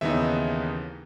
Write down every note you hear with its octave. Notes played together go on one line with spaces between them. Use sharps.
D#2 C#3 E3 B3 D#4 E5